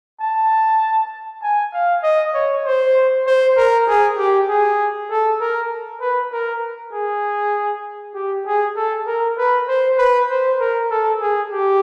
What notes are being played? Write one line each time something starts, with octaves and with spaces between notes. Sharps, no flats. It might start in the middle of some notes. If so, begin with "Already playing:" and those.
A5
G#5
F5
D#5
C#5
C5
C5
A#4
G#4
G4
G#4
A4
A#4
B4
A#4
G#4
G4
G#4
A4
A#4
B4
C5
B4
C5
A#4
A4
G#4
G4